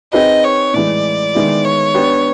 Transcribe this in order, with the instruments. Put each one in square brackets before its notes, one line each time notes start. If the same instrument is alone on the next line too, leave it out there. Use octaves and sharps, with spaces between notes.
[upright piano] C4 D#4 G#4 B4 [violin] D#5
[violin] C#5
[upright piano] A2 E3 G#3 [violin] D5
[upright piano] D#3 G#3 B3 E4
[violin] C#5
[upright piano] B3 D4 G4